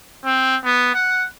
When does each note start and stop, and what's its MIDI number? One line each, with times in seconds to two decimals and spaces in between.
0.25 0.56 60
0.64 0.90 59
0.94 1.27 78